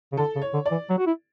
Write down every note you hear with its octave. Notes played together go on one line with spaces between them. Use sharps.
C#3
D3 A4
C#3
C#5
D3
D5
E3
F#3
F#4
E4